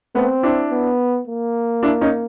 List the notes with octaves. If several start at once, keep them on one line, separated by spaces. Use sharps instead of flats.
A3 B3 C4
D4 E4
B3
A#3
D4 E4
C#4 D#4